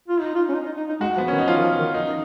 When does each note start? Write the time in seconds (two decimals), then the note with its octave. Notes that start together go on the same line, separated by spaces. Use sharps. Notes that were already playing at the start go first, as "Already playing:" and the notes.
0.08 F4
0.21 D#4
0.35 F4
0.49 C#4
0.54 D#4
0.66 D#4
0.77 D#4
0.89 D#4
1.00 G#3 F#4
1.17 F3 B3
1.28 D#3 C#4
1.38 D#4
1.47 F3 F4
1.57 D#3
1.63 F3
1.79 D#3
1.94 D#4